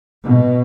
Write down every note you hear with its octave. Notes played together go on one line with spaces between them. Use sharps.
B2